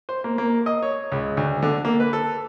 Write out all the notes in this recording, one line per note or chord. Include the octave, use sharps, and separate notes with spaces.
C5
A#3
A#3
D#5
C#5
C#2
D2
D3
A#3
B4
A4